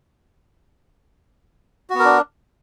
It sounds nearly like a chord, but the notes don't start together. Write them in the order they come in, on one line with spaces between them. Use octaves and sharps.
F#4 B3 A#4 D4